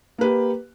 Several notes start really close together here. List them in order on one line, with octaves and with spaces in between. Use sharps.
A#3 B4 G4